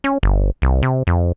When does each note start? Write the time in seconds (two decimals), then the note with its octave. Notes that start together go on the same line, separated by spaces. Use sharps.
0.04 C#4
0.23 G1
0.62 C2
0.82 C3
1.07 F2